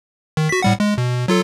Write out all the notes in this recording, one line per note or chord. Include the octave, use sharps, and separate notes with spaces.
D#3
F#4 B6
A2 G3 F#5
G#3
B2
F#3 F4 A4